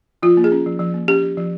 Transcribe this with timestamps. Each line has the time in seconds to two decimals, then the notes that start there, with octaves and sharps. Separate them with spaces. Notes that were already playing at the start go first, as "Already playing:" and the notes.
0.23 F3 F4
0.37 A#3
0.44 G#4
0.52 C#4
0.66 F3
0.80 F3
0.94 A#3
1.08 C#4 G4
1.23 F3
1.37 F3